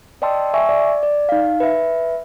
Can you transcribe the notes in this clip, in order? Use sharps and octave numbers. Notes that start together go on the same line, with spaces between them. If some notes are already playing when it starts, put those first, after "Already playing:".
D5 D#5 G5 A5 C6 E6
E5 G#5 C#6 E6
D5
D5
D#4 F5
B4 E5